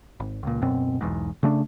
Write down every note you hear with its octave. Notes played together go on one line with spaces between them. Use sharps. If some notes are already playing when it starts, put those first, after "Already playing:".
G#1
C#2 A#2
D1 F#2 B2 C4
E1 B1 E2 G#2
C#3 A3 C4 D4